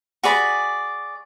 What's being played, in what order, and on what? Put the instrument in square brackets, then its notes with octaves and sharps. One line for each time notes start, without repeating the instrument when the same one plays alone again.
[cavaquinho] F#4 G#4 D5 B5